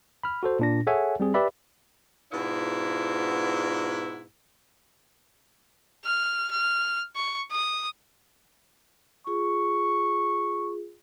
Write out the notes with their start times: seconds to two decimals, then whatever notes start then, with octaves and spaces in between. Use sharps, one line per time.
0.23 B5 F6
0.43 F#4 A4 C5
0.59 A#2 D4 A#6
0.87 G#4 A4 C#5 E5 F#5 G#5
1.20 G3 C4 G#4
1.34 G4 B4 D5 E5 B5
2.32 G#2 B2 B3 D4 E4 F4
6.04 F6
6.51 F6
7.16 C#6
7.51 D#6
9.27 F4 G#4 C#6